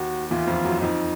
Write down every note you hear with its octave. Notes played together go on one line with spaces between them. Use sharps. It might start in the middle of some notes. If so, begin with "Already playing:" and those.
Already playing: D#2 D#3 F#4
E2 E3 F4
F2 F3
F#2 F#3
F2 F3 D#4